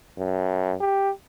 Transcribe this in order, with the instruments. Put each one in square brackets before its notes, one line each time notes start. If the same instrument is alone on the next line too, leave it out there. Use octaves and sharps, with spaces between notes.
[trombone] F#2
G4